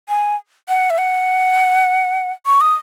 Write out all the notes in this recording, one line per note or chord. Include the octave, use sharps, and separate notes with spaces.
G#5
F#5
E5
F#5
C#6
D#6